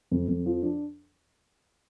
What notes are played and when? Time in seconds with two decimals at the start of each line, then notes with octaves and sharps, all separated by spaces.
0.11 F2
0.28 F2
0.46 F3
0.63 D4